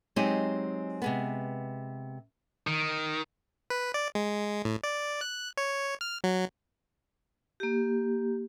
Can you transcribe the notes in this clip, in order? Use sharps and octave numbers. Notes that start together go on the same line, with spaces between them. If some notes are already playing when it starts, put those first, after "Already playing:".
F#3 G#3 C4 D#4 G4 D#5
C3 G#3 B3
D#3
B4
D5
G#3
A2
D5
F#6
C#5
F6
F#3
A#3 G4